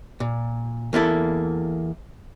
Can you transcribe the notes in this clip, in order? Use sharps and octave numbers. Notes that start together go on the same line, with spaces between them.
A#2
E2 A#3 E4 A4